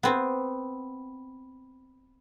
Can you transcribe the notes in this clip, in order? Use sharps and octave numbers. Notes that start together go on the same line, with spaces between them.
B3 C4